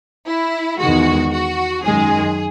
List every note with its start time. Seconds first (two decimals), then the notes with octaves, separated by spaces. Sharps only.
0.26 E4
0.78 E2 D#3 G#3 F#4
1.31 F#4
1.83 F#2 D#3 G#3 G#4